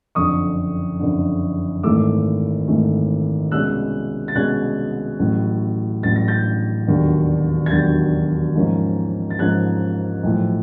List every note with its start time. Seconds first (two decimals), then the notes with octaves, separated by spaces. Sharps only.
0.15 F#1 F2 D3 C#6 D#6
0.99 F#1 F2 D3
1.83 G#1 G#2 E3 A3 D6 E6
2.68 G#1 G#2 E3 A3
3.51 C2 B2 G#3 C#4 E6 F#6
4.28 A6
4.35 C2 B2 G#3 C#4 F#6 G#6
5.19 A1 A2 F#3
6.03 A1 A2 F#3 A6
6.16 A#6
6.28 G6 A6
6.87 E1 D#2 D3 F#3
7.66 G#6
7.71 E1 D#2 D3 F#3 G6 A6
8.55 G#2 F3 A#3 C#4
9.30 A6
9.39 G#2 F3 A#3 C#4 F#6 G#6
10.23 B1 A2 F3